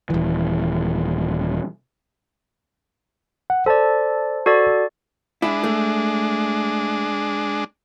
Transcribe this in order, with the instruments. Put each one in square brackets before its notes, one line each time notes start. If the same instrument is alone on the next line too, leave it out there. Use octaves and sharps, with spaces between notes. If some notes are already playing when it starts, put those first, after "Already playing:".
[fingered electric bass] D#1 E3
[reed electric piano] F#5
[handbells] A4 D5 [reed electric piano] C5 A5
[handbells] F#4 A4 D5
[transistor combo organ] G#3 D4 [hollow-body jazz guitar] E4
[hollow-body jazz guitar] A3